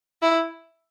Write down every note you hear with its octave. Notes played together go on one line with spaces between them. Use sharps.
E4